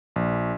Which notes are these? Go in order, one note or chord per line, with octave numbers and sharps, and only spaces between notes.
A#1